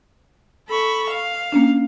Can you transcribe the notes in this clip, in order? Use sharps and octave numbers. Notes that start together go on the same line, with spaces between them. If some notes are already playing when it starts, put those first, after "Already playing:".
A4 B5 C#6
F5
A#3 C#4 D4